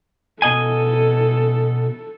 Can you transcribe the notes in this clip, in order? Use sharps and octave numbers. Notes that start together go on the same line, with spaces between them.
B2 A4 D#5 G#5